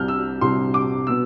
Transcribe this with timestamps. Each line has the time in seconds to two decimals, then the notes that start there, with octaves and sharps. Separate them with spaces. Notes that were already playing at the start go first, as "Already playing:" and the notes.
Already playing: C2 C3 G3 F6 G6
0.08 E6
0.41 C2 C3 G3 C6
0.74 D6
1.07 B2 B3 E6